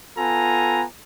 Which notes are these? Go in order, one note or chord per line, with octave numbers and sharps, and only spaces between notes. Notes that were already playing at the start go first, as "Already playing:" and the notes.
B3 F4 A4 G#5 A#5